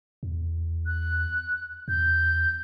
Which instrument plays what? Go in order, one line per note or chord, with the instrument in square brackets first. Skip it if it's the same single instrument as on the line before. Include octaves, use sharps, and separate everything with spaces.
[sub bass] E2
[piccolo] F#6
[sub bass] E2 [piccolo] G6